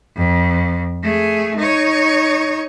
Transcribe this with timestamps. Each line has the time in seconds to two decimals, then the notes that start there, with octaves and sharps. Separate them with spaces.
0.16 F2
1.03 A3 G#4
1.56 D#4 C#5